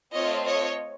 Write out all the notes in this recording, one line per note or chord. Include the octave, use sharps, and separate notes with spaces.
A3 C4 F4 C#5 D#5
C#5 D#5